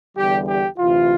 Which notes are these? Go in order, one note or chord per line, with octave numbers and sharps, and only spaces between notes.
E2 D3 G3 G4
G4
D2 C3 E3 F4